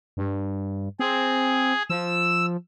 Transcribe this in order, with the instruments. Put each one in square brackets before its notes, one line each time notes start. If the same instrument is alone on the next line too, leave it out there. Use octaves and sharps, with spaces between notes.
[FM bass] G2
[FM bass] C4 [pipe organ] G#4
[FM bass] F3 [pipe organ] E6